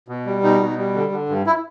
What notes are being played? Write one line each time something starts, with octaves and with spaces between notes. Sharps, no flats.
B2
G3
B2 D#4
B2
G3
D3
D3
G2
E4